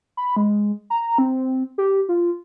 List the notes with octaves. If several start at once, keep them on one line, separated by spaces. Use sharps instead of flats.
B5
G#3
A#5
C4
G4
F4